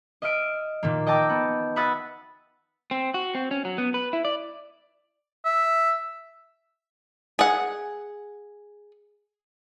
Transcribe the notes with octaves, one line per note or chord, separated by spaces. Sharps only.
D#5 E5 E6 F6 D7 D#7
A#2 D#3 A#3
D#5 G5 A5 A#5 D6 E6
B3
E5 F#5 B5 D#6 E6 A6
C4
F#4
C4
C#4
F#3
B3
B4
E4
D5
E5
G#4 F#5